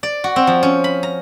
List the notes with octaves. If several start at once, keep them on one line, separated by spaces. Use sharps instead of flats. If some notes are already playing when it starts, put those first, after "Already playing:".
D5
F#4
C4
F3
C#4
B5
A#5